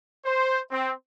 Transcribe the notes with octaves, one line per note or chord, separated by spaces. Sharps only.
C5
C4